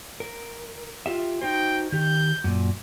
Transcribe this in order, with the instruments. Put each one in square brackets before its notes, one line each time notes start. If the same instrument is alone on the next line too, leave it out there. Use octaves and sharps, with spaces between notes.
[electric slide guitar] A#4
F4 G4 E5
[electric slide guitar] D#4 F#4 C5 [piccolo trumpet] G5
[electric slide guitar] D#3 G4 [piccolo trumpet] G6
[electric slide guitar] F#2 A#2